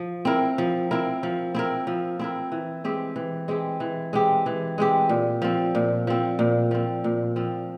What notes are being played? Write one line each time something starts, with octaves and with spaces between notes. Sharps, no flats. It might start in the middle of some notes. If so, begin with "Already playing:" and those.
Already playing: F3
C4 E4 A#4
F3
C4 E4 A#4
F3
C4 E4 A#4
F3
C4 E4 A#4
E3
G#3 C4 G4
E3
G#3 C4 G4
E3
G#3 C4 G4
E3
G#3 C4 G4
A#2
F3 C4
A#2
F3 C4
A#2
F3 C4
A#2
F3 C4